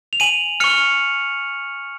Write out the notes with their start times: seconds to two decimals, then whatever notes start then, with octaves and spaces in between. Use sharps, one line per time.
0.13 F7
0.20 G#5 D#7 F#7
0.60 C#6 F6 C#7 F7